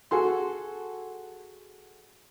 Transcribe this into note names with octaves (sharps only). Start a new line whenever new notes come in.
F#4 G#4 A4 C6